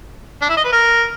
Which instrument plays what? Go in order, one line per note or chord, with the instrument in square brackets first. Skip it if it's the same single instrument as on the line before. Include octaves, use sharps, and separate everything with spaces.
[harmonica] D4
E4
D#5
B4
A#4